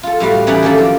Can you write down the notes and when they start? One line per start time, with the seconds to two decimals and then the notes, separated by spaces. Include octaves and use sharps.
0.03 F4 A4
0.20 A2 G3 F#4 F5
0.47 E3 C#4 D#4 D5 F#5 B5
0.63 D#3 F#3 A#3 D4 E4 A4
0.78 F3 G5